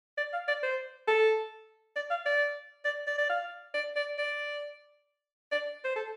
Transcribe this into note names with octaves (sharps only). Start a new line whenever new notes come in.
D5
F5
D5
C5
A4
D5
F5
D5
D5
D5
D5
F5
D5
D5
D5
D5
C5
A4